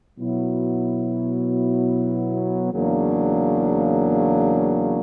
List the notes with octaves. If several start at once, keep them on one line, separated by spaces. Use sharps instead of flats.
B2 F#3 B3 E4
E2 C#3 F#3 A#3 D4